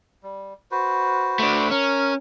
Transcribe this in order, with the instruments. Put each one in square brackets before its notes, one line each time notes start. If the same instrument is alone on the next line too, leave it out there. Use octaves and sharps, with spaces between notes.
[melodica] G3
F#4 B4 C5
[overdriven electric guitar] A3 D4
[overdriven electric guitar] C#4 [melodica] A#4